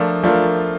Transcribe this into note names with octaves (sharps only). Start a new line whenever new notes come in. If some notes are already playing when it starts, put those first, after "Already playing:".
Already playing: F3 A3 D4 F4 A#4
F3 A3 D4 F4 A#4